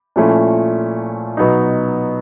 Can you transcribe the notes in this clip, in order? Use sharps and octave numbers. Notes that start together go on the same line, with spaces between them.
A#2 F3 A3 C#4 E4
B2 F#3 B3 D#4